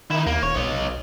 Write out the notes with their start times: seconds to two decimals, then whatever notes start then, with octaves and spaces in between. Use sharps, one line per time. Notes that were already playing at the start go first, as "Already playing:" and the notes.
0.10 D#3 D#4 E4
0.26 D#2 A#3
0.43 D#1 C#5
0.56 B1 C#5 D#5